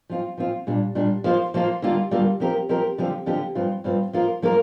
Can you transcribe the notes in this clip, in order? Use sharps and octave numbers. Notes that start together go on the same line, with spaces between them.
F3 C4 F4
F3 C4 F4
A#2 G3 D4
A#2 G3 D4
F3 A#3 F4 C5
F3 A#3 F4 C5
D3 G3 A#3 F4
D3 G3 A#3 F4
F3 C4 G4 A#4
F3 C4 G4 A#4
D3 F3 C4 G4
D3 F3 C4 G4
G2 F3 C4 F4
G2 F3 C4 F4
F3 A#3 F4 A#4
F3 A#3 F4 A#4